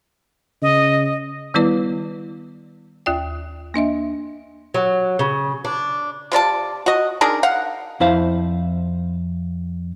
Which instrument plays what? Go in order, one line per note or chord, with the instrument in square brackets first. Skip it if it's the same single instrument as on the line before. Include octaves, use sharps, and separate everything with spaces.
[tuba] C#3 [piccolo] D#5
[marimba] D#3 G3 B3 E4 B4 D5
D#2 F4 D5 G5
A#3 D4 D#5 E5
[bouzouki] F#3
C#3
D4
[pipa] C3 F4 D5 A5
F#4 D#5
D4 D#4 G#4 A#4
F5 F#5
[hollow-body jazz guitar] F2 E4 C5 F5